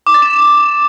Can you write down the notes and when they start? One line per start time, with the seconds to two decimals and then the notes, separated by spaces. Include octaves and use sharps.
0.07 D6
0.14 A6
0.22 E7